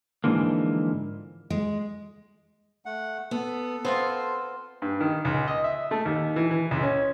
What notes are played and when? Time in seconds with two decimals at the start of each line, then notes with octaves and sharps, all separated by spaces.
0.24 G#2 B2 D3 E3 F3 A#3
1.50 G#3
2.86 A3 F#5
3.31 B3 A4
3.85 B3 C4 F4 C5
4.82 G2
5.00 D#3
5.25 C#2
5.48 D#5
5.64 E5
5.91 A3
6.05 D#2
6.36 E3
6.51 E3
6.71 C#2
6.83 C#4